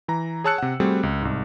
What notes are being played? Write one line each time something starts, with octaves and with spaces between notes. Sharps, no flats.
E3 A#5
G#4 C#5 A5 E6 F#6 C#7
C3 F#5
G3 A3 C4 F#4 G#4
C#2
C2 G#2